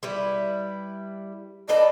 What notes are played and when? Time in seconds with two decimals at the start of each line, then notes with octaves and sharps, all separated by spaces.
0.03 G3 E4 B4
1.69 A4 B4 D5 D#5